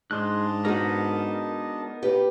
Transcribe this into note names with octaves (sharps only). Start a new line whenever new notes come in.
G#2 G#3 D4 D#5 A5 C6 F#6
G#3 B3 D#4 F#4 A#4
G4 B4